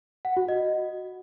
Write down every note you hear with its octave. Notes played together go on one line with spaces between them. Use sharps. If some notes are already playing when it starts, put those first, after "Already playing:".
F#5
F#4
D#5